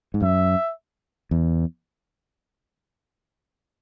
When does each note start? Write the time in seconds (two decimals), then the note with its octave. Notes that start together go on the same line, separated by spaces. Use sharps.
0.14 G#2
0.22 F#2 E5
1.31 E2